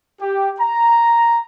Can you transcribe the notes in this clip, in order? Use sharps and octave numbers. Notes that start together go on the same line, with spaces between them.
G4
A#5